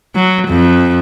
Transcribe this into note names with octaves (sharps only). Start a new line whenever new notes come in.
F#3
F2